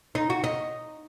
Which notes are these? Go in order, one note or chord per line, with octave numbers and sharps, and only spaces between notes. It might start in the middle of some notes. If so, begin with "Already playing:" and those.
D#4
F#4
D#4